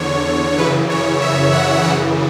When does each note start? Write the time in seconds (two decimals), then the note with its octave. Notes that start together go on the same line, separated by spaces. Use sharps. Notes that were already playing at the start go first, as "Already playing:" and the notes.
Already playing: E2 D3 C#5
0.58 F#2 C#3 E3 B4
0.90 C#5
1.22 E5
1.53 F#5
1.83 F#2 C#3 E3 F#5